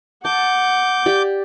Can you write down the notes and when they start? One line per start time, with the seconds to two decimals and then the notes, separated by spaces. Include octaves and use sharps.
0.25 F#5 A5 D6 G6
1.06 G4 D5